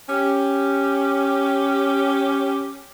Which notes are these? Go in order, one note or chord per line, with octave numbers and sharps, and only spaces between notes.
C#4 G4